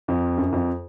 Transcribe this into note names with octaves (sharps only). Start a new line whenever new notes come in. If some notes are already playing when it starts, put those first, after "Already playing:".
F2
F#2
F2